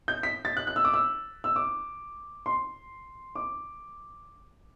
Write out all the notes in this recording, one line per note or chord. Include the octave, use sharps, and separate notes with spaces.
G6
B6
A6
F#6
F#6
E6
D6
E6
E6
D6
C6
D6